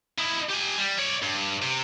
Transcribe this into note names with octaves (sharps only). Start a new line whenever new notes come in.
D#4 E4
G4 G#5
G3
C#5 D5
G2
C3